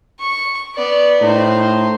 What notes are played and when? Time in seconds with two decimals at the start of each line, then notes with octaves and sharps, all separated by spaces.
0.20 C#6
0.75 B3 D5
1.21 A2 D#4 C5